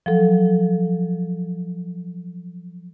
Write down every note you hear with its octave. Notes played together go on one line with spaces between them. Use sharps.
F3 F#3 A4